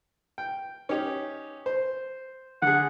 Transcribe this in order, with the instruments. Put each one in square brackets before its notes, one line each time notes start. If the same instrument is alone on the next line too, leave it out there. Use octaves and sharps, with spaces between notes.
[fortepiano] G5
C#4 D#4 G4
C5
[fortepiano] D3 G#4 [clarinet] F#5